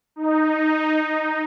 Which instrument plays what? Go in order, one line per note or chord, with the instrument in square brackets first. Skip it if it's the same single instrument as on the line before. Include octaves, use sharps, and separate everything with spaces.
[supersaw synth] D#4